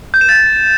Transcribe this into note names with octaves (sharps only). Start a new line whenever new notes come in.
G6
E7
A6